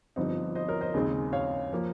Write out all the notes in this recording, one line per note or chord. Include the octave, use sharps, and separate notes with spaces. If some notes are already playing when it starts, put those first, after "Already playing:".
G1 G2 F3 C4 D#4
C5 D#5
A#4 C#5
C5 D#5
D#2 C#3 G#3 C4
C#5 F5
F3 A#3